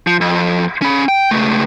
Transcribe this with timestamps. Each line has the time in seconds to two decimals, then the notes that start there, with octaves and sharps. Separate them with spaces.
0.07 F3
0.21 F2
0.82 C#4 B5
1.08 G5
1.31 C#2 A3